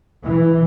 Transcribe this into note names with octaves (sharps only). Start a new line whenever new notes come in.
E3